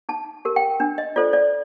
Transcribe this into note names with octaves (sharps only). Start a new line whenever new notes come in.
D#4 A5
G4 A#4
G5
D4
D#5
F4 A4 C5 D5
D5